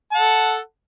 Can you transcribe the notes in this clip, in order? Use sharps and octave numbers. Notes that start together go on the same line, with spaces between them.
A4 F#5 A5